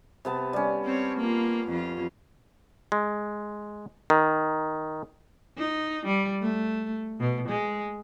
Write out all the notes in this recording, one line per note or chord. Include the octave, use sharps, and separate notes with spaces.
C3 B3 A5
G3 C#4
C4 C#5
A#3 F4
F2 F4
G#3
D#3
D#4
G3
A3
B2
G#3